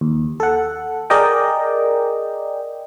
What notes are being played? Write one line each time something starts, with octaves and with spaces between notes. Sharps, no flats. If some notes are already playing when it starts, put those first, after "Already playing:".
D#2
A4 F#5
G#4 A#4 D5 D#5 G5